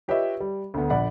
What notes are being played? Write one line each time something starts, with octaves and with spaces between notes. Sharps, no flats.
F4 G4 B4 C#5 D#5 E5
G3
D2 D3 B3
A#1 D5 F#5 B5